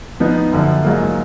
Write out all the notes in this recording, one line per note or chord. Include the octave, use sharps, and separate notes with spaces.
F3 B3 D#4
F#2 D3 F3
G#2 F#3 A#3 F4